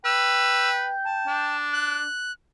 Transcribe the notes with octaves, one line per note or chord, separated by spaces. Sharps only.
B4 G5 E6
A5
D4
F#6